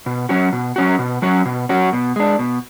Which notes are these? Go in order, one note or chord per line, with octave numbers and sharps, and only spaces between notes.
B2
F#3 C#4 F#4
B2
F#3 C#4 F#4
B2
F#3 C#4 F#4
B2
F#3 C#4 F#4
B2
G#3 D4
B2